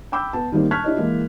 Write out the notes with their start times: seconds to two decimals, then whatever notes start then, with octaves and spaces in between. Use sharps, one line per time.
0.12 G5 B5 D6 E6 G6
0.33 B3 A5
0.52 D#3 G3 A#3 C4
0.71 A5 C#6 F6 F#6 G#6 B6
0.84 D4 E4 G4 C#5 D#5
0.97 E3 G#3 A#3